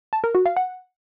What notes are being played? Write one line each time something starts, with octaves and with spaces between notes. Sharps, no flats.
A5
A#4
F#4
F5
F#5